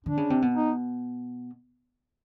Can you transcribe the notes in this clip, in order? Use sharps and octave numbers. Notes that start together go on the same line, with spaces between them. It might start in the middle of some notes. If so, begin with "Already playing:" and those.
D3 D4
C#3
C3
B2
D#4